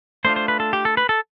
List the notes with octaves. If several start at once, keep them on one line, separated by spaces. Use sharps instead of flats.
A3 D4 F4 C5
C5
B4
A4
G4
A4
B4
A4